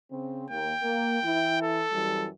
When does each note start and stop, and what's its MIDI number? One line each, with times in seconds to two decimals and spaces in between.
0.11 0.45 49
0.11 0.45 60
0.50 0.73 39
0.50 0.73 58
0.50 1.59 79
0.83 1.18 58
1.24 1.83 52
1.24 1.83 64
1.62 2.28 69
1.92 2.27 42
1.92 2.27 52
1.92 2.27 55